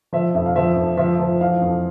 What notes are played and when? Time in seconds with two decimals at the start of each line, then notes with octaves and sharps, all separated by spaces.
0.13 F3 E5
0.34 F2 E5
0.46 F5
0.56 F3 E5
0.76 F2
0.97 F3 E5
1.20 F3
1.41 E3 F5
1.61 F2